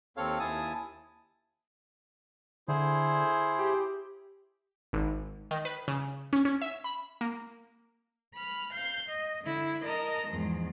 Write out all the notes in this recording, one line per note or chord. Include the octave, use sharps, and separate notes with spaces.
D#2 C4 A4 C#5 F5
D#2 E4 G#5 A5 D#6
D3 E4 G#4 C5
G4
G#1
D#3
B4
C#3
C#4
C#4
E5
B5
A#3
B5 F6
F5 G6
D#5
D3 E4
A#4 D#5 A5 A#5
E2 G#2 F3